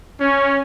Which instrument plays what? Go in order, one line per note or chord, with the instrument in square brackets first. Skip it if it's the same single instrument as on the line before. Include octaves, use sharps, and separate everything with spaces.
[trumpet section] C#4